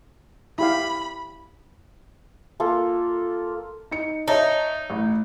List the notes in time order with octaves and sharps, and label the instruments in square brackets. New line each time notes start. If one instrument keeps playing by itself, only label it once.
[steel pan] E4 G4 F5 [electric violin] B5
[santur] A#3 F4 A4
[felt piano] D#4 C#7
[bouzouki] D#4 [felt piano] C#5 E5 A5
[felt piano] A1